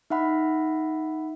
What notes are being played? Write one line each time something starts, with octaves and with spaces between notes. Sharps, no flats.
D#4 E5 F#5 B5